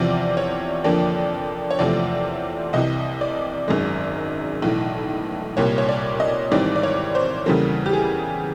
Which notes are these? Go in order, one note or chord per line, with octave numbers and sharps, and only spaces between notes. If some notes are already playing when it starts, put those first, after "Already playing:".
Already playing: E2 C3 F3 D5
C#5
F2 D3 F3 A#3 D5
C#5
E2 C3 F3 A3 C4 D5
C2 C3 E3 D#5
D5
G#1 F#2 D#3 G#3
B1 A2 E3
C2 A#2 G3 A#3 C#5
C#5
D5
D#5
G#1 G#2 E3 G3 C4 D5
D5
C#5
C5
E2 C#3 E3 G3 A#3 A4
G4
G#4